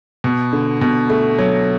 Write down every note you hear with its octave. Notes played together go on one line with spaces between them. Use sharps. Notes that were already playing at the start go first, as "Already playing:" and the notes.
B2
D3
B2
A3
F#3